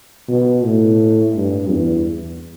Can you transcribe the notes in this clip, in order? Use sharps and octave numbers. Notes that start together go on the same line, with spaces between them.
B2
A2
G2
E2